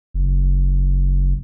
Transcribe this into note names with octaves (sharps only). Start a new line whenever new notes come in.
F#1